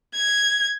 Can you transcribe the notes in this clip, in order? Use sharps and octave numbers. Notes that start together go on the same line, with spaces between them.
G#6